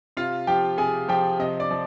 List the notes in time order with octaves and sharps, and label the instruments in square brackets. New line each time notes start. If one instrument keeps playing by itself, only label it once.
[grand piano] C3 F4 F5
F3 G4 G5
C3 G#4 G#5
F3 G4 G5
C3 D#5
D5 D6
F3